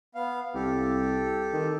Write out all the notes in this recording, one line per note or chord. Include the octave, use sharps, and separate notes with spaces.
B3 F5
C2 G4 A4
D#3